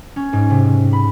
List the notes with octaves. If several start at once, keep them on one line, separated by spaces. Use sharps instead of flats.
C#4
G#2
C3
B5